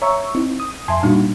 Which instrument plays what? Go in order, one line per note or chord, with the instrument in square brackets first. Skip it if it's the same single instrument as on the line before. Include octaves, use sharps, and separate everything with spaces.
[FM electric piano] C#5 E5 C#6 [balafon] A#5
[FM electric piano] C4 D#4 [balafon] E4
[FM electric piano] D#6
[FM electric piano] F2 G#5 C6 [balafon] E5 A5
[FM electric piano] A#2 F#4 [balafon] G3 D4 D#4